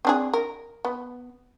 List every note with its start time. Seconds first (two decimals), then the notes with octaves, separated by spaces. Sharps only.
0.05 C4 D4 G#4
0.34 A#4
0.85 B3